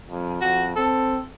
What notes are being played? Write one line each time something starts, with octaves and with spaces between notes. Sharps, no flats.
F2
F2 F#4
C4 A4